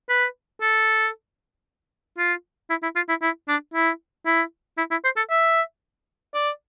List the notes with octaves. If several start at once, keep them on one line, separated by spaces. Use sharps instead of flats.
B4
A4
F4
E4
E4
F4
E4
E4
D4
E4
E4
E4
E4
C5
A4
E5
D5